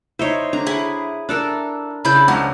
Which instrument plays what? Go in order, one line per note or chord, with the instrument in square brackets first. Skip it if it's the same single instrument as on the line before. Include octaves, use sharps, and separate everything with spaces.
[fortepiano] D#4 E4 [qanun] C5 C#5
[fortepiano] D3 [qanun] A#5
[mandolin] E4 [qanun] G#4
[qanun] D4 A4 A#4 [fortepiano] F#6
[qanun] C#3 D4 E4 [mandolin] B5 G6
[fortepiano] C#2 F3 A#5 [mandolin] F#4